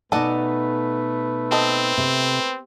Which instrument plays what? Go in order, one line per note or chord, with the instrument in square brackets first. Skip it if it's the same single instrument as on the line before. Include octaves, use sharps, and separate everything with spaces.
[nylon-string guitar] B2 D#4 G#5 [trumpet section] A3 B4 [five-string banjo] A4 D5 F#5
[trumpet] C4 [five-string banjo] A4 D#5
[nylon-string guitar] C3